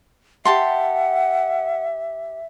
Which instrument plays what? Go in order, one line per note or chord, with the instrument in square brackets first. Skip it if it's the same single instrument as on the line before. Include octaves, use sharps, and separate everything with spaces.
[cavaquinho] G4 A5 C6 [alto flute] E5 [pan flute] F#5